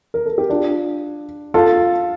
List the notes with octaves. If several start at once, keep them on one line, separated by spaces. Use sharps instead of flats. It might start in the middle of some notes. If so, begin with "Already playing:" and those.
A#4
A4
G4
D4 F4
F4 A4